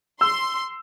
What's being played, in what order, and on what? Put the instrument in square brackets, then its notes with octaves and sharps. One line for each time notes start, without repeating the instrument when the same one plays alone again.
[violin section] C6 [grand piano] E6